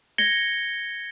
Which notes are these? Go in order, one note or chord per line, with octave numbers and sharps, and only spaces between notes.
G#6 A#6 C#7 G7